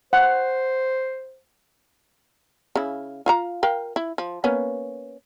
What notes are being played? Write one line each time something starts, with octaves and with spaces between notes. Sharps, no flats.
C5 F#5
C#3 E4
F4 F5 A#5
A#4 F5 G5
E4
F3
A#3 B3 C#4